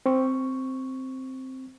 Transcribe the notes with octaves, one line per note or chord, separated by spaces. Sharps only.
C4 C#6